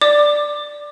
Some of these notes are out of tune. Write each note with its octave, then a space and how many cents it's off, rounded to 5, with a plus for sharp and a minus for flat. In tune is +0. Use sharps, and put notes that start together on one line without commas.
D5 +0 D6 +20